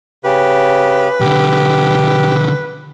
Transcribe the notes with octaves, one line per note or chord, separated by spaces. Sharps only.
C#3 G4 B4
B1 D3 G4